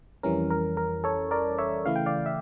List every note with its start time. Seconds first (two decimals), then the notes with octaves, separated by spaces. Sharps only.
0.23 F2 E3 G3 C#4 A#4
0.50 A#4
0.77 A#4
1.04 A4 C#5
1.31 A#4 D5
1.58 C#5 E5
1.85 C#3 E3 A3 E4 F5
1.96 G5
2.06 D5 F5
2.26 E5